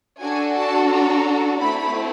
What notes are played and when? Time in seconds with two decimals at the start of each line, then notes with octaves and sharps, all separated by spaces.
0.21 D4 F#4 A4 G#5
0.56 A5
0.90 A#5
1.60 A3 C4 E4 B5